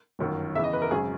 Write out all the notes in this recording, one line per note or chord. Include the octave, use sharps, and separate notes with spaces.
G1 F#2 D#3 F#3
E2 C#3 E3 E5
D#5
B4
A#4
G#1 F#2 C#3 G#4